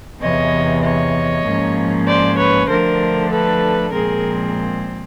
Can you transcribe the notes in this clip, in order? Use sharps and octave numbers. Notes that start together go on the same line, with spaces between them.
E2 C3 E3 C#5 D#5
C#5 D#5
G#2 F3 A#3 C#4
C5 D5
B4 C#5
D3 F3 A3 D4 A#4 C5
A4 B4
A#2 F3 G#3 C4 G#4 A#4